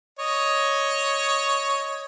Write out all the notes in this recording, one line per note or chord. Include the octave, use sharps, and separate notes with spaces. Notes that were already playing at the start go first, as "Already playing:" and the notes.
C#5 D#5